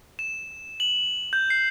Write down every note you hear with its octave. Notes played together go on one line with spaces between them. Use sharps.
E7
F#7
G6
C7